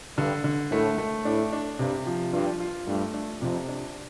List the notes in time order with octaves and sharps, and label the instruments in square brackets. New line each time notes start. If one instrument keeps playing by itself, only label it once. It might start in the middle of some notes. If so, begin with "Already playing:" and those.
[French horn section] G2 [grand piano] D3
[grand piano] D3
[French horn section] A2 [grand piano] A3
[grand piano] A3
[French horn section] A2 [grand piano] D4
[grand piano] D4
[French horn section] G2 [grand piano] C3
[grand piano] F3
[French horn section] G2 [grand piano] F4
[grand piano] F4
[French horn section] G2 [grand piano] A3
[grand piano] D4
[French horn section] F2 [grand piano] C3
[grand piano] D4